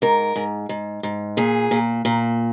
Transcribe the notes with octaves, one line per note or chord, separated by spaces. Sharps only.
G#2 A#4
G#2
G#2
G#2
A#2 G#4
A#2
A#2